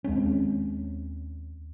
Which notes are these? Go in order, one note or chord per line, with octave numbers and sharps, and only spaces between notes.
D#2 G#3 C4 C#4